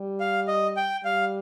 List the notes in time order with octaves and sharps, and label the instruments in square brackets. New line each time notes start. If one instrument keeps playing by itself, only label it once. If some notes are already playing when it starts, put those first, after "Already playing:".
Already playing: [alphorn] G3
[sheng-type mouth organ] F5
D#5
G5
[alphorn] G3 [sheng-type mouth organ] F5